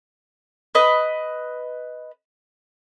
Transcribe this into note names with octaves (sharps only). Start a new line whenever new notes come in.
B4 D#5